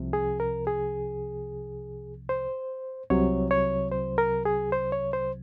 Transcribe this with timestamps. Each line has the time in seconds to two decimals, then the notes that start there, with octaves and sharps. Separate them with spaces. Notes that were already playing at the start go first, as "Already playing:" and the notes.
Already playing: C2 C3 F3
0.13 G#4
0.40 A#4
0.67 G#4
2.29 C5
3.10 C2 C3 F#3 C#5
3.51 C#5
3.92 C5
4.18 A#4
4.45 G#4
4.72 C5
4.92 C#5
5.13 C5